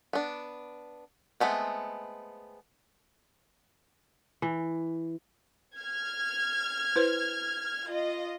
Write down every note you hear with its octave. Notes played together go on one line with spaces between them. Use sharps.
B3 D4
G#3 A3 B3 C4
E3
F6 G#6
E4 B4 C5
F4 D#5